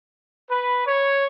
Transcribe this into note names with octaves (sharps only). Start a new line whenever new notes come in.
B4
C#5